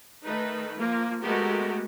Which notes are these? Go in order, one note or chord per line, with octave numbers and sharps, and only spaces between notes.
D#3 A3 D#4 B4
F3 A#3 F4
G#3 A3 B3 F#4 G4 A#4